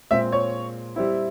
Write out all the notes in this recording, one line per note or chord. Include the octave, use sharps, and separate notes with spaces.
A#2 G#3 C4 F4 E5
C#5
G3 C4 E4